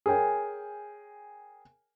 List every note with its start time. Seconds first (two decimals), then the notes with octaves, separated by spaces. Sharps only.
0.06 G#4 A#4 C#5 G5 G#5